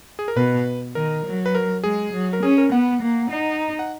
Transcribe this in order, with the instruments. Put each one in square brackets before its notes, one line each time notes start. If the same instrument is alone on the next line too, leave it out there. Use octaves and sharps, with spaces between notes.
[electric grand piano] G#4
A#4
[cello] B2 [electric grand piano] B4
[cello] D#3 [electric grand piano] A#4
[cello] F#3
[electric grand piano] B4
A#4
[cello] G#3 [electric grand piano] G#4
[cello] F#3
[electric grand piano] A#4
[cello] C#4 [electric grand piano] G#4
[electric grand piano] A#4
[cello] B3 [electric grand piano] F#5
[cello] A#3
D#4
[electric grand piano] F#5